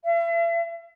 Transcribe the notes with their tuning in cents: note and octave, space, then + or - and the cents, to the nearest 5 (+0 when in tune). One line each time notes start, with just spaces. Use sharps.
E5 +40